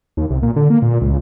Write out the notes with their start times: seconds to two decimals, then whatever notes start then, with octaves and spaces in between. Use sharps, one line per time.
0.17 D#2
0.30 C2
0.43 A#2
0.56 D3
0.70 A#3
0.82 A#2
1.01 C#2